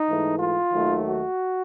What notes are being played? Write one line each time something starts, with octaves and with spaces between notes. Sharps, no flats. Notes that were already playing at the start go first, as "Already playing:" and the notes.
Already playing: D#4
G#2 E3 A3
F4
D#2 D#3 F#3 A3
F#4